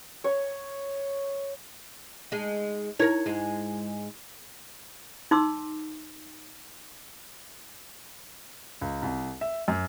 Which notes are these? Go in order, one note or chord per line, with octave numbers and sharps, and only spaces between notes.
C#5
G#3 D#4
D#4 E4 A#4 C#5 G#6
G#2 G#3
D#4 C6 D6 E6
C#2
C2
E5
F#2